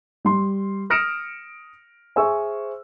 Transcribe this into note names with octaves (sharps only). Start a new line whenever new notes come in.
G3 C6
D#6 F6 A#6 C#7 D7 E7
G#4 C5 E5 G#5 C#6 E6